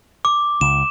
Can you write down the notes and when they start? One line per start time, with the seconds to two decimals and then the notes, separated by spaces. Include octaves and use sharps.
0.25 D6
0.61 C#2 E7